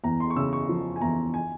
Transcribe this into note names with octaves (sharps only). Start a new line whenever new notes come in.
E2 A#5
C6
C#6
C#3 E6
C#6
F3
G#5
E2 A#5
G#5